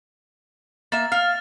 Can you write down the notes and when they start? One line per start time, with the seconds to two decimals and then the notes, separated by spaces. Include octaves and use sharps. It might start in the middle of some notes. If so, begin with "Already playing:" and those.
0.92 A#3 E5 A6
1.12 F5 F6